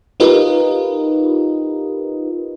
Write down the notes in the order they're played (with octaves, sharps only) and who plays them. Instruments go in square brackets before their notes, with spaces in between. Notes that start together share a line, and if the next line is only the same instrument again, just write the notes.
[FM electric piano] D#4 F4 G4 A#4 B4 D#5